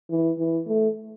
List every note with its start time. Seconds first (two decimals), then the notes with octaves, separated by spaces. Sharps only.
0.10 E3
0.38 E3
0.67 A3